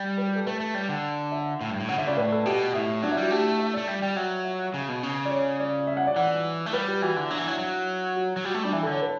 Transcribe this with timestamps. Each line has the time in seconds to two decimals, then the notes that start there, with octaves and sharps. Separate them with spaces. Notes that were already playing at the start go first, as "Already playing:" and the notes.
Already playing: G3
0.18 B4
0.27 G4
0.36 A4
0.46 A3 B4
0.60 A3
0.74 G3 D5
0.89 D3
1.32 E5
1.61 A2
1.70 G2
1.80 A2
1.89 C#3 F#5
1.98 D3 E5
2.07 C#3 D5
2.17 A2 B4
2.32 A4
2.46 B2 G4
2.75 A2 E4
3.02 F#3 D4
3.12 E4
3.17 G3
3.22 F#4
3.31 A3 G4
3.59 E5
3.74 D5
3.77 A3
3.88 G3 E5
4.03 G3
4.16 F#3 E5
4.45 E5
4.74 C#3
4.89 B2
5.03 C#3
5.25 D5
5.31 C#5
5.60 D5
5.87 E5
5.97 F#5
6.07 D5
6.16 E3 F#5
6.66 A3
6.73 G3 B4
6.87 G4
7.02 E3 F#4
7.16 D3 E4
7.30 F#3 D4
7.38 E3
7.45 F#3 E4
7.59 F#3
8.16 F#4
8.37 F#3
8.44 G3 F#4
8.54 A3
8.63 G3 D4
8.73 E3 E4
8.83 A4
8.87 D3
8.92 C#5
9.02 B4